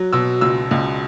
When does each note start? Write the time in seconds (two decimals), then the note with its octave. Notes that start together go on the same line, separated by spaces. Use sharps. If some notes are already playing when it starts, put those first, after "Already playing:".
Already playing: F#3
0.13 B2 E6
0.41 C#2 E6
0.71 C#2